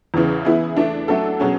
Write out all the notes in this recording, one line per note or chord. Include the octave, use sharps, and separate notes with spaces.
E2 C#3 E3
E3 B3 E4 G#4
E3 A3 D4
F#3 A3 D4 A4
B2 F#3 C#4 G#4